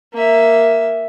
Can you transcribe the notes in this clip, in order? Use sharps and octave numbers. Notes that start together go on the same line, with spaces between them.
A#3 E5